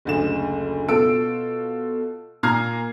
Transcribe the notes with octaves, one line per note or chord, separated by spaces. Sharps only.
F#1 D2 E7
B2 F4 A4 E6 D7
A#2 A#3 A#5 F6 G#6 C7